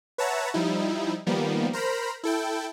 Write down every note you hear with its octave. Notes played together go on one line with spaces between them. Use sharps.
B4 C#5 E5 F#5 A5 A#5
F3 G3 D#4 E4
D#3 F3 G3 A#3 B3
A#4 C5 A#5 B5
E4 A4 G5